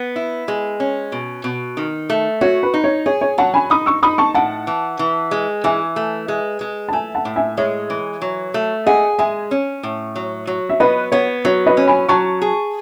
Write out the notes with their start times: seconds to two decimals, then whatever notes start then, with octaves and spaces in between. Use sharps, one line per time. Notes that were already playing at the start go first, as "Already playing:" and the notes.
Already playing: B3
0.16 E4
0.48 G#3
0.80 C#4
1.12 B2
1.44 B2
1.77 D#3
2.10 A3
2.41 F#4 C#5
2.63 B4
2.74 D#4
2.84 C#5
3.06 G#4 C#5
3.21 C#5
3.38 F#3 F#5 A5
3.54 G#5 B5
3.70 D#4 B5 D#6
3.86 C#6 E6
4.03 D#4 B5 D#6
4.18 A5 C#6
4.34 A2 F#5 A5
4.67 E3
4.99 E3
5.31 G#3
5.64 E3 E5 G#5
5.96 A3
6.28 G#3
6.61 G#3
6.89 A5
6.93 A3 E5 G#5
7.15 F#5 A5
7.25 A2
7.36 E5 G#5
7.57 G#3 C#5 E5
7.90 E3
8.22 F#3
8.54 A3
8.86 G#4 D#5 F#5
9.19 G#3 E5 G#5
9.51 C#4
9.83 A2
10.16 F#3
10.47 F#3
10.69 E5
10.80 B3 B4 D#5
11.12 B3 C#5
11.45 F#3 C#5
11.66 B4 D#5
11.77 C#4
11.88 G#5 B5
12.09 F#3 A5 C#6
12.42 G#4